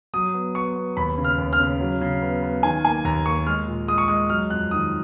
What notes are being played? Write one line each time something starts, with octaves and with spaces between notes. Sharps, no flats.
F#3 D#6
B3
B3 C#6
B3
D#2 B5
C#3
F6
D#2
F6
C#3
F#3
C#3
B3
B3
D#3 G#5
A#3 G#5
D#2 A#5
A#3 C#6
G#3 F6
A#2
G#3 D#6
C#6
G#3 D#6
F#3 F6
F2 F#6
D#3 D#6